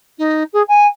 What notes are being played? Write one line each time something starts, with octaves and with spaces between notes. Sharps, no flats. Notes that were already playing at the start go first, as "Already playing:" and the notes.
D#4
G#4
G#5